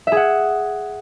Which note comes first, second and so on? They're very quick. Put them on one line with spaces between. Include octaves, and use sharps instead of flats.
E5 G#4 F#5